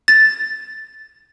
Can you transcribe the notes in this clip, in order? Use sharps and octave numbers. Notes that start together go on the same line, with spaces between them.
A6